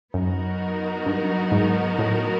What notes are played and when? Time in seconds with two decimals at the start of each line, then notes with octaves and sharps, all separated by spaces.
0.13 F#2 F#3 B3 D#4 F#4 A#4
1.06 G2
1.52 G#2
1.99 A2